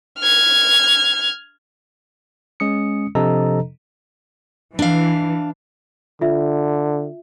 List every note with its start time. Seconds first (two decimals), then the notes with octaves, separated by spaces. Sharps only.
0.19 F6 G#6
2.60 G#3 C#4 D#6 C#7
3.15 C3 F3 D4 A4 D#5 A#5
4.79 E3 D4 F5
6.21 D3 F4 E5